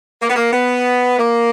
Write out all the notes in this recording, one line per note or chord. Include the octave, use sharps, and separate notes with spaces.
A#3
B3
A#3
B3
A#3